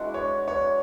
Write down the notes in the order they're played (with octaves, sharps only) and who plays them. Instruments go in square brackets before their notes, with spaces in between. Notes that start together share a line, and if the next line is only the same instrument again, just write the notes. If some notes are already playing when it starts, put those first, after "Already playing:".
Already playing: [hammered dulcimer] E3 G#3 D4 F#4
[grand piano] C#5
C#5